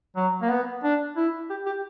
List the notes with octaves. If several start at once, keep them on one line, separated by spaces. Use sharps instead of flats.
F#3
A#3
B3
D4
E4
G4
G4